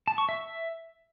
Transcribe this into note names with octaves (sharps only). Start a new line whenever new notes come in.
A5
C#6
E5